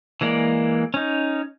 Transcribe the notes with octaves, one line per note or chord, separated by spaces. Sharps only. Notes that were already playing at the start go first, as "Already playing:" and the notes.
E3 G#3 A#3 D5
C#4 D#4